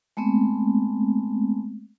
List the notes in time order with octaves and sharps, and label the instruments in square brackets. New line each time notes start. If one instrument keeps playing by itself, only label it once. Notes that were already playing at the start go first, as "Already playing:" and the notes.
[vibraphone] G#3 A3 B3 C4